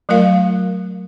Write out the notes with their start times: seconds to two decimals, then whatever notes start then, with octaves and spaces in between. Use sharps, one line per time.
0.09 F#3 A3 F4 A#4 F5